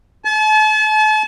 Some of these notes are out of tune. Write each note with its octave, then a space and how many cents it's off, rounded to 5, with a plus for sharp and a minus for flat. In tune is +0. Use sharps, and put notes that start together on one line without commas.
A5 -40